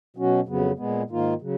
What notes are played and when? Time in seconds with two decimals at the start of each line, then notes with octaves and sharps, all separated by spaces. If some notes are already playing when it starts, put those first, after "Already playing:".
0.16 B2 F#3 C#4 F#4
0.46 F2 C#3 F#3 B3
0.77 A#2 G#3 B3
1.09 G#2 D#3 A#3 F4
1.42 C#3 F#3